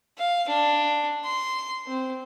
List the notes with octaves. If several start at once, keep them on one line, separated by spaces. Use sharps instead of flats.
F5
D4
C6
C4